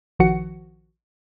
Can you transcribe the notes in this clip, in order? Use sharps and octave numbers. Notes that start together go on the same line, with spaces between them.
A#1 D#3 F3 F#4 F#5 C#7